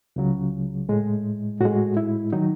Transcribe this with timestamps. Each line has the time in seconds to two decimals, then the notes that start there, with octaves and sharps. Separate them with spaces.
0.16 C#2 C#3 F#3
0.89 A2 G#3
1.61 A2 G#3 F#4
1.97 E4
2.33 D#3 F#3 D#4